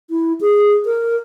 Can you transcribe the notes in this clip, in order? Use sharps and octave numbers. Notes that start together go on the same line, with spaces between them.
E4
G#4
A#4